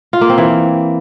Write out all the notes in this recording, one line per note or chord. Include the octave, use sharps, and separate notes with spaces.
F4
A#3
C4
E3